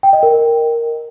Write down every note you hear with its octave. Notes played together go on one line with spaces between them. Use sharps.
G5
D#5
A#4